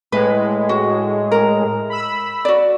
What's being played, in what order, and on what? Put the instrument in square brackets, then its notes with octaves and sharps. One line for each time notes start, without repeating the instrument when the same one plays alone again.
[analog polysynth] A2 G#3 [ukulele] B4
[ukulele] F#4
A#4
[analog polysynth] B5 E6
[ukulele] F#4 D5